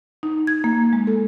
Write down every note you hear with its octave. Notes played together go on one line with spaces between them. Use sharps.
D#4
G#6
A#3
G#3
A4